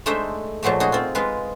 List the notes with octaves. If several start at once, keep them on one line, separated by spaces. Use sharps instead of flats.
G#3 A3 D4 D#4 C5 E5
A#2 F3 F#3 G#3 A3
D#4 F#4 G#4
C4 F4
G#3 F4 B4